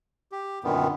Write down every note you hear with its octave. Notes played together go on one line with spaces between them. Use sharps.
G4
F#2 A#2 D3 D#3 B3